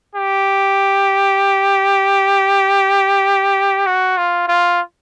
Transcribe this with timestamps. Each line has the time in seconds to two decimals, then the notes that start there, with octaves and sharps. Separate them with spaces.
0.15 G4
3.86 F#4
4.17 F4
4.48 F4